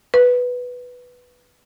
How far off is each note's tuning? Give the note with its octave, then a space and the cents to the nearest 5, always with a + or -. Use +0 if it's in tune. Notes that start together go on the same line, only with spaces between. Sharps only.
B4 +0